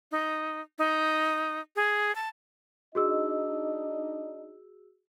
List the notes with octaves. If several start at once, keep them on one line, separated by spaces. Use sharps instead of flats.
D#4
D#4
G#4
A5
D4 D#4 F#4 G#4 D#5 E6